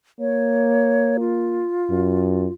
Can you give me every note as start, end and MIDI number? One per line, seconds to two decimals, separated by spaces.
0.20 1.64 58
0.20 1.17 73
1.20 2.53 65
1.90 2.47 42